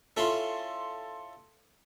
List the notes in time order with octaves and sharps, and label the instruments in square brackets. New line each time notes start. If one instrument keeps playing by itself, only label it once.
[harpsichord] C#4 E4 F4 [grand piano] A4 C6